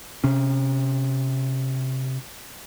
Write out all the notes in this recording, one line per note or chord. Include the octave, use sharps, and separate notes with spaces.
C3 C#4